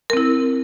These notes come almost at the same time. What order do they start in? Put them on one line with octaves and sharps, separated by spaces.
A#4 C4 E4